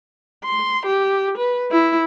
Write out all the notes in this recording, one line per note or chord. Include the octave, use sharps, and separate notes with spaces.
C6
G4
B4
E4